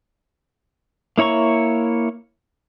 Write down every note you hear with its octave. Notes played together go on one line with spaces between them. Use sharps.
A#3 E4 C#5 A#5 C#6